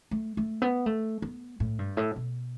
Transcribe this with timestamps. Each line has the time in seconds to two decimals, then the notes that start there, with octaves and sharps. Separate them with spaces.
0.11 A3
0.37 A3
0.62 B3
0.86 A3
1.22 B3
1.60 A2
1.79 G2
1.97 A2
2.16 B2